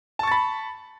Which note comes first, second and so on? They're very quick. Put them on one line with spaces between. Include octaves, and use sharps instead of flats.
A5 C#6 A6 B5